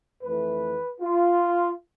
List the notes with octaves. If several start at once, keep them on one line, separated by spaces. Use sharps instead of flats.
F2 E3 A3 B4
F4